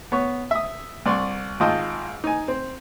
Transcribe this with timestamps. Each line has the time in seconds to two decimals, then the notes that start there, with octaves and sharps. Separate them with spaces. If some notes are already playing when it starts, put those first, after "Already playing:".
0.12 B3 C#5 C#6
0.51 E5 D#6
1.06 C2 D5 C6 C#6
1.60 G#1 F4 D#5 G5 A5
2.24 D#4 G#5
2.48 C4